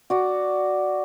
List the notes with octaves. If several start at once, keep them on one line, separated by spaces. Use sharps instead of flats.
F#4 D5